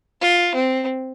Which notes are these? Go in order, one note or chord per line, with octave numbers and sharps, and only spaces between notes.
F4
C4